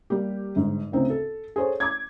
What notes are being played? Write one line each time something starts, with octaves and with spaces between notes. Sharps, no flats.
G3 A#3 G4
G1 G#2
D2 C#3 C4 D#4
A4
G#4 A4 C5 C#5
D6 G#6